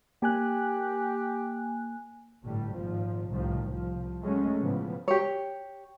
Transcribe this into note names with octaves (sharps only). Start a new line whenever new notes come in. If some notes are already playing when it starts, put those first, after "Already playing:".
A#3 G4 G#5 F#6
G1 A2 G3
G#1 A#2 F3
C2 A2 D#3 F3
C2 F3
F#3 G#3 A3 C#4
A2 C#3 E3 F3 B3
G4 C#5